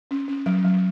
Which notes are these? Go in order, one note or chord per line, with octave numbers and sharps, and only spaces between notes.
C#4
C#4
F#3
F#3